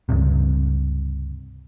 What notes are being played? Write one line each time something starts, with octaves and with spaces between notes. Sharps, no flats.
C#2 G2 C3